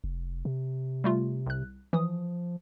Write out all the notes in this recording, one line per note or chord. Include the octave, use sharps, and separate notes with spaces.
F1
C3
G3 A3 F4
C2 F#6
E3 F3 D#6